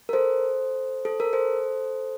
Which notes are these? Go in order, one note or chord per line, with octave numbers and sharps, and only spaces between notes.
A#4
A4 C5
A4
A#4
A4 C5